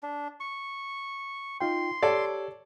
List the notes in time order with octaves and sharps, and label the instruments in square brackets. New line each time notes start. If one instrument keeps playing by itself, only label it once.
[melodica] D4
C#6
[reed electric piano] D#4 F4 G5 [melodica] C6
[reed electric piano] G4 C#5 G#6 [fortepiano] A4 D5